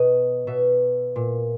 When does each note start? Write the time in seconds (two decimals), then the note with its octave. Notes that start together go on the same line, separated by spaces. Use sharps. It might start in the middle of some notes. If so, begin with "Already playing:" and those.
Already playing: B2 D#5
0.47 B2 E5
1.16 A#2